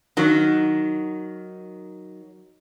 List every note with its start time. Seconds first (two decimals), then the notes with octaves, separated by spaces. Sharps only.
0.17 D#3 F#3